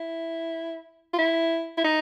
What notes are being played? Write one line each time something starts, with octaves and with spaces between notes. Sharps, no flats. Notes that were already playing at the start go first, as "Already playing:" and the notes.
Already playing: E4
F4
E4
E4
D#4